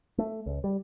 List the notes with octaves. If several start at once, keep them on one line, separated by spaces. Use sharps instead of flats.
A3
C#2
G3